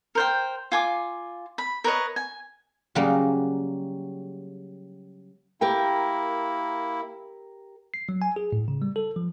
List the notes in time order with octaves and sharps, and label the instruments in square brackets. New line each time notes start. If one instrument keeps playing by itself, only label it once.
[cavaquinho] A#4 C5 G5
F4 G#5 D6
B5
A#4 B4 C#5 D#5
G#5
[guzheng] C#3 F#3 G3 A#3
[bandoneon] A#3 E4 [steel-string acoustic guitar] G4 A#4 G5
[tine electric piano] C7
F#3
G#5
G#4
A2
C#3
G3
A4
F3